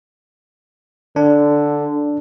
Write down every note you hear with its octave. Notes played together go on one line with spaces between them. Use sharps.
D3 D4